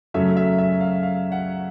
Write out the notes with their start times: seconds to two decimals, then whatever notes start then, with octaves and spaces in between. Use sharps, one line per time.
0.14 F#2 C#3 F#3 A3 C#4 E5
0.37 E5
0.58 E5
0.80 F5
1.03 F5
1.32 F#5